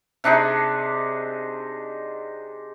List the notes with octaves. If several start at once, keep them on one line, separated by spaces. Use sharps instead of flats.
C3 D4 D#4 G#4